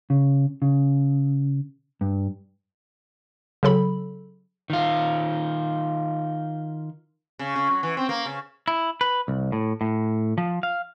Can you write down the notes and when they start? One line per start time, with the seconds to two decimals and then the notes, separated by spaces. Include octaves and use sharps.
0.10 C#3
0.62 C#3
2.01 G2
3.63 C#3 F#3 A4 B5
4.70 D#3 F4
7.39 C#3
7.56 C#3
7.70 F#3
7.83 E3
7.97 C4
8.09 A#3
8.26 C#3
8.68 E4
9.01 B4
9.28 C2
9.52 A2
9.81 A2
10.38 F3
10.63 F5